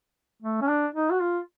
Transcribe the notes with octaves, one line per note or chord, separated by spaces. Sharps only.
A3
C#4
D4
D#4
F#4
F4